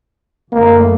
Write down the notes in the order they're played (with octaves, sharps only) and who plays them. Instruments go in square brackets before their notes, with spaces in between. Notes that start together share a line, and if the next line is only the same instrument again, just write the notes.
[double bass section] F#2 D3 A3 [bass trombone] A#3